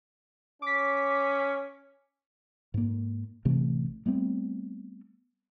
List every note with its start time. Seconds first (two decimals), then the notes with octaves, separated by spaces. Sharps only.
0.62 C#4 D6 B6
2.74 G#2 A#3
3.45 A1 C3 E3 A3
4.06 G3 A3 B3 C4